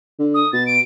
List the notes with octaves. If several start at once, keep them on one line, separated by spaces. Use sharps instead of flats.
D3
D#6
B2 A6
D7